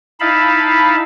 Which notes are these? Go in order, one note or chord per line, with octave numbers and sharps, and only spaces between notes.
D#4 E4 F5 A5 B5